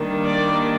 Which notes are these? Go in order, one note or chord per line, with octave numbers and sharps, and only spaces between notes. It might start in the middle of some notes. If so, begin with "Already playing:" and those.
Already playing: D#3 G3 A#3 D4
D5